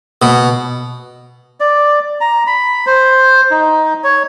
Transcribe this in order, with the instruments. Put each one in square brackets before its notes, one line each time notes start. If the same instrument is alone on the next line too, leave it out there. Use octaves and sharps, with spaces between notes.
[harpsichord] B2
[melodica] D5
A#5
B5
C5
D#4
C#5